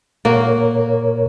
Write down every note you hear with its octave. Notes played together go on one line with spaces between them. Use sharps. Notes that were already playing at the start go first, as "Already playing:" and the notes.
A#2 A#3 F#4 A#4 C#5